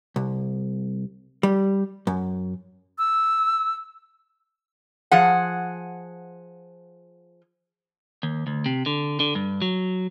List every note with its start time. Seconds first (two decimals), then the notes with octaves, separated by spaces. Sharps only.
0.16 C2
1.43 G3
2.07 F#2
2.98 E6
5.11 F3 G#4 F#5
8.23 D#2
8.47 D2
8.66 C3
8.86 D3
9.20 D3
9.35 G2
9.62 F#3